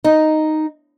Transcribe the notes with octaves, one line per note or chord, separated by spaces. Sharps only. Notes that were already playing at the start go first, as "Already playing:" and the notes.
D#4